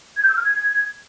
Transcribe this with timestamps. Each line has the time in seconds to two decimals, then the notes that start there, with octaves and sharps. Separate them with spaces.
0.17 G#6
0.24 G6
0.30 E6
0.36 F6
0.42 G#6